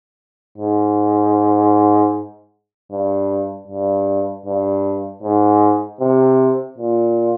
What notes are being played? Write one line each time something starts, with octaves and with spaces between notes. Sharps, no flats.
G#2
G2
G2
G2
G#2
C3
A#2